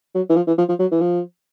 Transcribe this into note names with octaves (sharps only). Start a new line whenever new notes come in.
F#3
E3
F3
E3
F3
F3
F#3
E3
F3